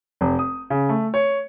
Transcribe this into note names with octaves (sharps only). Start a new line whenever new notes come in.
F1
D#6
C#3
A3
C#5